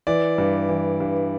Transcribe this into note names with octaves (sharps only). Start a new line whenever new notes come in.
E3 D5
G2
E3
G2